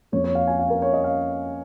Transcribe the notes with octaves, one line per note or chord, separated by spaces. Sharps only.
F2 F3 A#3 C#5
C#5
F5
G#5
F5
A#4
C#5
D#5
F5